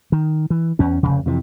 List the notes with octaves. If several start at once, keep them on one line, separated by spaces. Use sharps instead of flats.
D#3
E3
E2 C#4
F1 F2 C#3
F2 C3 E3